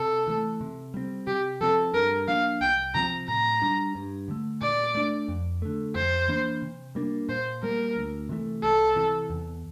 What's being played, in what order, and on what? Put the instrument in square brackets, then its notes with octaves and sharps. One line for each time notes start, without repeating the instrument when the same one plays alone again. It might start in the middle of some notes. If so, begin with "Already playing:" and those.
Already playing: [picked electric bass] C3 [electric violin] A4
[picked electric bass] E3 A3
C3
G3 C4
[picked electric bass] C3 [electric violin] G4
[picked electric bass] F3 C4 [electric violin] A4
[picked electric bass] G2 [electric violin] A#4
[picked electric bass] F3 A#3 D4 [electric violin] F5
[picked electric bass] C2 [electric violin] G5
[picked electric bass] C3 F3 C4 [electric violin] A#5
[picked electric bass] A2 [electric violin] A#5
[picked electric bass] G3 D4
G2
D3 A3
[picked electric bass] A#2 [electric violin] D5
[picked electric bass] A3 D4
F2
D3 A3
[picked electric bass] F2 [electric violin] C5
[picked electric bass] E3 A#3 D4
C3
G3 A#3 D4
[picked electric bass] A#2 [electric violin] C5
[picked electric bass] G3 A#3 [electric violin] A#4
[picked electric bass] D2
C3 E3 A3
[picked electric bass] C2 [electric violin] A4
[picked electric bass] C3 E3
E2